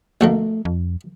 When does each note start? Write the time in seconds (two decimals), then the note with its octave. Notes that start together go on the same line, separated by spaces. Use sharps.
0.21 A#1 B2 A3 A#3
0.65 F2